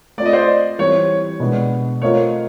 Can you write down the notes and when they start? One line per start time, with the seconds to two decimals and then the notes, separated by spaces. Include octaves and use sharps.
0.18 A3 C4 F4 D5
0.26 D#5
0.33 C5 D5
0.79 E3 G3 C4 C#5
1.40 B2 G#3 B3 D4
2.02 A3 C4 F4 A#4 C#5 D#5